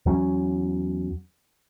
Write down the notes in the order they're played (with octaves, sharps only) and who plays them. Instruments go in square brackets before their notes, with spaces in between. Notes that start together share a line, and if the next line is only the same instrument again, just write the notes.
[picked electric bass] E2 F#3 C#4